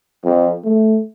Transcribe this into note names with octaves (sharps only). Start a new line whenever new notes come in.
F2
A3